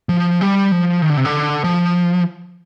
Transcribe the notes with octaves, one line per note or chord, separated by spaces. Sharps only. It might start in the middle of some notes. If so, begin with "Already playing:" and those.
F3
G3
F3
D#3
D3
C3
D3
F3